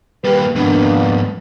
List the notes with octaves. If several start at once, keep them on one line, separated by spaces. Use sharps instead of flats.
G3 A#3 G4 B4
F2 G#2 A#3 B3 D4